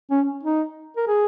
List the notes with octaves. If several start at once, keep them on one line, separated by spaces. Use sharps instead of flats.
C#4
D#4
A#4
G#4